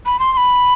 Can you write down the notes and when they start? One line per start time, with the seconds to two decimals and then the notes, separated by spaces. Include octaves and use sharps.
0.06 B5
0.19 C6
0.33 C6
0.37 B5